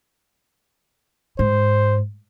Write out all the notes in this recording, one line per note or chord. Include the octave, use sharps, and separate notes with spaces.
G#2 C5